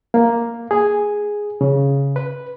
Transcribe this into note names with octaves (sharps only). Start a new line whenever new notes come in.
A#3
G#4
C#3
B4